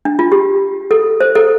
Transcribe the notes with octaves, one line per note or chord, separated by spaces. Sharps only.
D4
F4
G4
A4
C5
A4